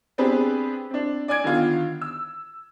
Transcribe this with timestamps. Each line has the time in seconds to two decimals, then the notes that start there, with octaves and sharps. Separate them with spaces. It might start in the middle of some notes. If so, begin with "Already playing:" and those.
0.18 B3 C4 D4 G4 G#4 B4
0.91 C4 D4
1.28 D5 G#5 D6 G#6 D7
1.44 D3 D#3 B3 F4
2.01 E6